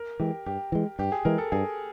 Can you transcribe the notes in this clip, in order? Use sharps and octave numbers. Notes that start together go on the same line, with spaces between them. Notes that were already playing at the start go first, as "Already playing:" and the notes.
Already playing: A#4
E3 G#3 G4
G2 G4
E3 G#3
G2 G4
G#4
E3 G#3 A#4
A4
G2 G#4